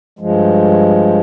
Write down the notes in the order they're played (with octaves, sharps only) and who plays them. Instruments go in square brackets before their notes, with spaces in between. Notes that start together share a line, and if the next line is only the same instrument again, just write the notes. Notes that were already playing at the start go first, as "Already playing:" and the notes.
[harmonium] G2 F3 G#3